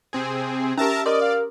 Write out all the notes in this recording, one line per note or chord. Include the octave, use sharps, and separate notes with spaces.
C3 C4 G#4
C#4 G4 A#4 E5 A5 A#5
A#4 D5 D#5 C6 D6 D#6
F5